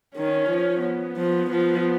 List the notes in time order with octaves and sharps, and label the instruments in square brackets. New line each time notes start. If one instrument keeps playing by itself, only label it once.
[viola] D#3 [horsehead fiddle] C#4
[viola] F3
[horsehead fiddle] B3
[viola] F3
F3